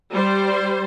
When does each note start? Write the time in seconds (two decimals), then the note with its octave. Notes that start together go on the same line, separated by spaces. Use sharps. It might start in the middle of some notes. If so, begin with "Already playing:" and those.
0.12 G3 C5